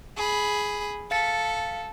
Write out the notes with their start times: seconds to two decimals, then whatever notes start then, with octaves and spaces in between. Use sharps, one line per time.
0.17 G#4 B5
1.11 A4 F5 A6 C#7